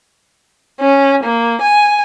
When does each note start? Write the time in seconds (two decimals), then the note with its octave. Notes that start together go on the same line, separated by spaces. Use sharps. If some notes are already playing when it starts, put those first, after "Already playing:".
0.80 C#4
1.23 A#3
1.61 G#5